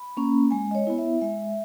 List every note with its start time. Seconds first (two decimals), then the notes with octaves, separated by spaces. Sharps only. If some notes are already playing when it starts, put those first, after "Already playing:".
Already playing: B5
0.17 A#3 C#4
0.51 G#3 G#5
0.71 D#5
0.75 C#5
0.87 B3 E4
0.98 E5
1.21 G#3 E5